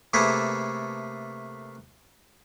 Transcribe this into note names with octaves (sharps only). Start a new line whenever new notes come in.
C3 A3 A#3 G#4 A4 B4